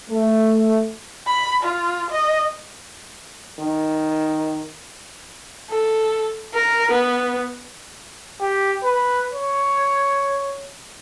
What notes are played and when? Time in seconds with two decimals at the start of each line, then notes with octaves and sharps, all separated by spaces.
0.11 A3
1.27 B5
1.63 F4
2.10 D#5
3.59 D#3
5.70 A4
6.54 A#4
6.91 B3
8.41 G4
8.84 B4
9.33 C#5